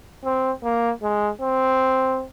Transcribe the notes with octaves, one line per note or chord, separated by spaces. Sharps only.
C4
A#3
G#3
C4